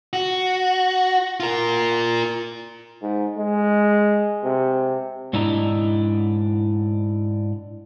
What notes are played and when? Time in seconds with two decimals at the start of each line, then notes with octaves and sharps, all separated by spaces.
0.13 F#4
1.40 F4 A#4
3.02 G#2
3.37 G#3
4.44 C3
5.33 G#2 D4 E4 D#5 A#5